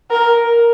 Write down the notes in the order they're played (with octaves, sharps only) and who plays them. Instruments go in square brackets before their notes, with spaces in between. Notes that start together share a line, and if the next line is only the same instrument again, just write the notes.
[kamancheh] A#4